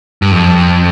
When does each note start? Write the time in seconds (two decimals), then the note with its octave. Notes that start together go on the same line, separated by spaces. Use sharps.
0.22 G2
0.32 F2